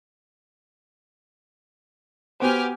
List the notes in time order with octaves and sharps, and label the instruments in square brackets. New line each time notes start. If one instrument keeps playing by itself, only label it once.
[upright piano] B3 F#4 C5 [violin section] G4 G#5 F6